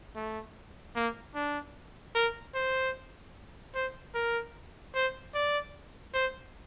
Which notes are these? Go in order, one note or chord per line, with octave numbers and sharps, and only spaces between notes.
A3
A#3
D4
A#4
C5
C5
A#4
C5
D5
C5